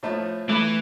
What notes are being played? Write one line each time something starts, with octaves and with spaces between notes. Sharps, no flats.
A2 F3 A3
E3 A3 B5 D6